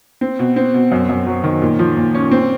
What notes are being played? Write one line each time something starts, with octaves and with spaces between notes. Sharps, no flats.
C4
B2
C4
B2
F#2
F#2
F#3
D#3
A#2
F3
A#2
C#4
C4